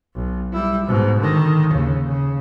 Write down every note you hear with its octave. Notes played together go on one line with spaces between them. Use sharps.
B1
G3 E4
G#2 B2
D3 D#3
D#2 C#3
C#3